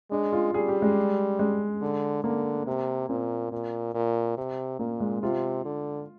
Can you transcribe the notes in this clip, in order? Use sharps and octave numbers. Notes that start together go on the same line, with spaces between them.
G#3 D4
F4
G3 G#4
G4
G#3
G#3
D3
D3 A#3
C3
A#2 C4
A#2
A#2
C3
A#2 A#3
G#3
C3 F4
D3